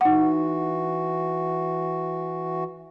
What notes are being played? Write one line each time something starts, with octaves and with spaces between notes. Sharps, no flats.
E3 D#4 F#4 F#5